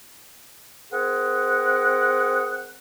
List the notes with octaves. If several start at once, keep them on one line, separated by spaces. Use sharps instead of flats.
C4 G#4 A#4 F#5